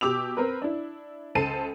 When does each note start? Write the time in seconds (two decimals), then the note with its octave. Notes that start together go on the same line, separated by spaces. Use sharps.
0.01 B2 G4 D6 E6 F7
0.37 C4 A#4 B4
0.62 D4 E4
1.35 C#2 A4 C5 A5 C7 D#7